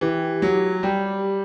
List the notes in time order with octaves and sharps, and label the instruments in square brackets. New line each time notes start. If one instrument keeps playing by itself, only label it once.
[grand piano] E3 [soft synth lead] G4
[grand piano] F#3
[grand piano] G3 [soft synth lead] G4